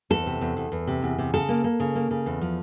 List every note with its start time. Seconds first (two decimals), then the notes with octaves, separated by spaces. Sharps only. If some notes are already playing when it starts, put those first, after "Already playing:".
0.10 E2 A4
0.26 C3
0.41 E2
0.57 E2
0.72 E2
0.87 C3
1.03 E2
1.18 C3
1.34 C#3 A4
1.49 A#3
1.64 A#3
1.80 C#3
1.95 A#3
2.11 C#3
2.26 E2
2.41 F3